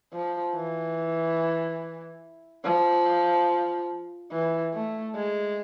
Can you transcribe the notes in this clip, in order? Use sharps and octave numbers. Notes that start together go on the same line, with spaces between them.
F3
E3
F3
E3
A3
G#3